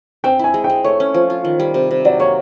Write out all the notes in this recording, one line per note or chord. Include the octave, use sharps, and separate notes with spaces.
C4 G5
E4 G#5
G#3
G5
G#3
A3 C#5
C#4
F3
F4
D#3
G3
C3
C3
F#3 D5
A#3 C#5